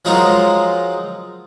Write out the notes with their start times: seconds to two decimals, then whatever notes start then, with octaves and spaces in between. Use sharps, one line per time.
0.05 F3 F#3 G#3 D#4 F4 A#4